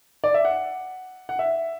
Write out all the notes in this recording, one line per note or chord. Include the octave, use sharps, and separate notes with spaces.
D5
E5
F#5
F#5
E5